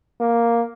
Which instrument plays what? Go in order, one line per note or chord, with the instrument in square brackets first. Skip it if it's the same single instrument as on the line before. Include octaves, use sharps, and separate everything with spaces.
[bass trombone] A#3